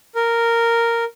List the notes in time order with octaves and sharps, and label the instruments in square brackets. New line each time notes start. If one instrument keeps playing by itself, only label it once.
[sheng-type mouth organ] A#4